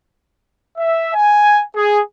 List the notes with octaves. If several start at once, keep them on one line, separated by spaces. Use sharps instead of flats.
E5
G#5
G#4